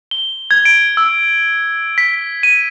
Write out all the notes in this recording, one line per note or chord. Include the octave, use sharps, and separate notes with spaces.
G7
G#6
D7
E6
B6
D#7